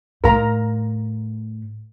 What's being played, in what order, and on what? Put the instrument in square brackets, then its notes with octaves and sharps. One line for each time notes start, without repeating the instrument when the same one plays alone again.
[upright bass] A2 [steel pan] A#4 F5 A#5